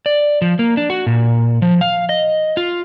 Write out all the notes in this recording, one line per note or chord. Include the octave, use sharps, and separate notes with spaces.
D5
F3
A#3
D4
F#4
A#2
F3
F5
D#5
F4